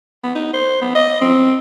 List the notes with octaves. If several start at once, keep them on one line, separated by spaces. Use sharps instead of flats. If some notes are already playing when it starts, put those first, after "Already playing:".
B3
D#4
C5
B3
D#5
C4